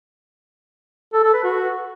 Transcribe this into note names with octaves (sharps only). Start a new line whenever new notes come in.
A4
A4
B4
F#4